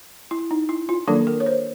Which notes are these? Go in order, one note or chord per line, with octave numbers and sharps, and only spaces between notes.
E4
D#4
E4
F4
D#3 F#3 A#3 D4 A4
A#4
C#5
C5